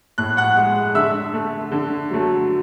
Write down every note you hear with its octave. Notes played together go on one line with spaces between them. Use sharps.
A2 F#6
F#5 F#6
G#3
D3 E5 E6
A3
D3
F#3 A3